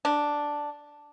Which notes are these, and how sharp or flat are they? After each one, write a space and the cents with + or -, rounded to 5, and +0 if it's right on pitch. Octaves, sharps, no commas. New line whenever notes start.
D4 +0